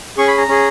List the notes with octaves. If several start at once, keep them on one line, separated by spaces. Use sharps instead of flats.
C#4 G#4 C#6
B5
A#5
C#4 G#4